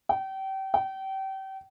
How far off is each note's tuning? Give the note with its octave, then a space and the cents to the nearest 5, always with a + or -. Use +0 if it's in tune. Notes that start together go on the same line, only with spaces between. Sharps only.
G5 -30
G5 -30